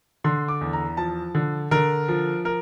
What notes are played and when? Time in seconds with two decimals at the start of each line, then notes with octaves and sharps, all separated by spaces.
0.24 D3 C6
0.48 D6
0.61 E2
0.73 A#5
0.97 F3 A5
1.35 D3
1.71 D3 A#4
2.08 F3
2.45 A#4